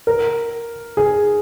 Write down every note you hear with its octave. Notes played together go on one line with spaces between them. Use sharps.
A#4
G#4